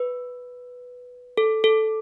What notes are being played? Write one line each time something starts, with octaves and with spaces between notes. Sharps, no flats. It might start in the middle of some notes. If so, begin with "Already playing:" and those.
Already playing: B4
A4
A4